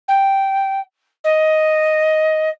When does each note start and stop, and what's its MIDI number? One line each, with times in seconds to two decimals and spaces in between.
0.08 0.80 79
1.24 2.49 75